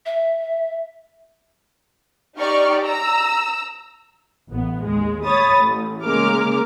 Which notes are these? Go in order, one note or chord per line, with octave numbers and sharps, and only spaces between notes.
E5
D#4 G4 D5 C#6 F6
A#5 E6
A1 B3
D#2 G#3
C#5 B5 D#6 A6
A1
C#3 G#3 A#3 A#4 D6 F6